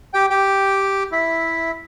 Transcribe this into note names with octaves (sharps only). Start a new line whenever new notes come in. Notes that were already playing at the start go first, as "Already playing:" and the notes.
G4 G5
G4 G5
E4 E5